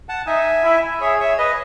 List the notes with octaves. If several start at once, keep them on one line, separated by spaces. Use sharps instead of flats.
F#5 A5
D#4 E5 G#5
E4
G#4 C#5 E5
C#5 E5
B4 D#5